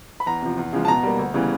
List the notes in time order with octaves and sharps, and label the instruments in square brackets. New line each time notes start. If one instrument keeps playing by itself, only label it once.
[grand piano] B5
E2 A#5
C3 F3
E2
C#3 F3 G#3
A5
B2 A#5
G3 A#3
D2
C#3 E3 G3 B3